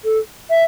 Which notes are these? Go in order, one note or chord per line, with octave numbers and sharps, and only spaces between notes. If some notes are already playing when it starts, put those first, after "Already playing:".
A4
E5